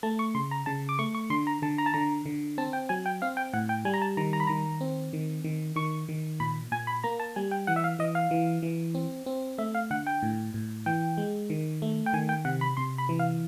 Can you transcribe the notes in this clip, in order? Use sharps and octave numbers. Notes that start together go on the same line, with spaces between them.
A3 A5
C#6
C#3 C6
A#5
C#3 A5
D6
A3 C#6
C#6
D3 C6
A#5
D3 A5
A#5
A5
D3 A#5
D3
C4 A5
G5
F#3 G#5
G5
C4 F5
G5
A2 F#5
G5
G3 G#5
A#5
A5
D#3 A#5
A#5
B5
D#3 A#5
C4
D#3
D#3
D#3 C#6
D#3
A#2 B5
A#2 G#5
B5
A#3 A#5
A5
G3 G#5
G5
E3 F#5
E5
F5
E3 D#5
F5
E3
E3
C4
C4
A3 E5
F5
D3 F#5
G5
A2
A2
E3 G5
G#3
D#3
A3
G5
D#3 G#5
G5
C3 F#5
B5
C3 C6
B5
E3
F5